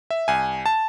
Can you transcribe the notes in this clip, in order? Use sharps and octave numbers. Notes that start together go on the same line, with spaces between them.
E5
C2 G#5
A5